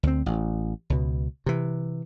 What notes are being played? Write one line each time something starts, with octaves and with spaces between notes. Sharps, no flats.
D2 C4
A1
C#2 B2
C3 E3